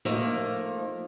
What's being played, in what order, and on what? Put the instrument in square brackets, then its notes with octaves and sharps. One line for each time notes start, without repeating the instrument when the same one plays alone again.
[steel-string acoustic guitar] F3 A3 A#3 D#4